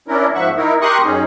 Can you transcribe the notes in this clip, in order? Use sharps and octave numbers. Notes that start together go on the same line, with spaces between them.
C#4 D4 E4 A#4
G#2 F3 E5 F#5 C#6
D#4 E4 A#4
G4 A#4 C6 C#6 D#6 F#6
F#2 C#4 D#4 G#4